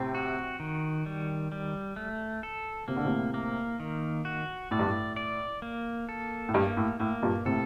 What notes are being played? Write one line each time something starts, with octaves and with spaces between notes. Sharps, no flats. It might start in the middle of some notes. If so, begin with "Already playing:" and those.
Already playing: A2 C3 C4
F#4
D#3
G3
G3
A3
A4
C3 A#3
D3
A2 C3
A#3
D#3
F#4
A2 D5
G2
A2
D5
A#3
A4
A2
G2 A#3
A2
A2 A#3
G2 A#2
A2 C3 A4